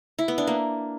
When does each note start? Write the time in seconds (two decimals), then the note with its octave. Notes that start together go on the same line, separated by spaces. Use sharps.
0.19 E4
0.28 B3
0.38 D4
0.47 A#3